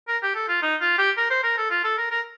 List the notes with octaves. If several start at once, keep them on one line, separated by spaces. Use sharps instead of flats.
A#4
G4
A4
F4
D#4
F4
G4
A#4
C5
A#4
A4
F4
A4
A#4
A#4